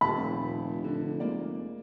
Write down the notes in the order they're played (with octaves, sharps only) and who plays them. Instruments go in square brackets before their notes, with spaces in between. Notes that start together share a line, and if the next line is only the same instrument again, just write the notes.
[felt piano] D#1 G3 A5 [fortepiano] B5
[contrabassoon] F1
[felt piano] D3
G#3 A#3 D5